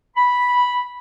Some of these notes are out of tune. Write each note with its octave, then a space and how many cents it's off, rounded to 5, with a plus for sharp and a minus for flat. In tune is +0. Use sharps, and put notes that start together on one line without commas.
B5 -5